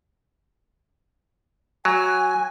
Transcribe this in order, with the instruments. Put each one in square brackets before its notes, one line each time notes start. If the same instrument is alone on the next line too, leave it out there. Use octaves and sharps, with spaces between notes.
[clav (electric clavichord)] F#3 [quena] G#5